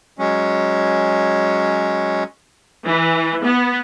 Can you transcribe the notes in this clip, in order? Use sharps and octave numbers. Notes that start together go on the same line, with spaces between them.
F#3 G#3 C#4
E3
B3